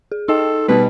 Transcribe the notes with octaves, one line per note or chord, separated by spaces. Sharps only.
G#4
D#4 A4 D#5 G5
B2 G3 B4